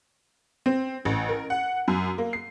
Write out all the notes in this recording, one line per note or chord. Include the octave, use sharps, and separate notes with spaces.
C4
A1
A#4
F#5
F#2
A#3
C7